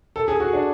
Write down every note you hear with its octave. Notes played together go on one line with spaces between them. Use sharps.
A4
G#4
F#4
D4